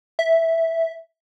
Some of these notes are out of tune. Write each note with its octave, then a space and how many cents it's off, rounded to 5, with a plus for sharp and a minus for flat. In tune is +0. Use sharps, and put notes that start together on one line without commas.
E5 -5